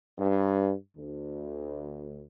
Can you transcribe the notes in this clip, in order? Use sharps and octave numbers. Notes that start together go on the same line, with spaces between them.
G2
D2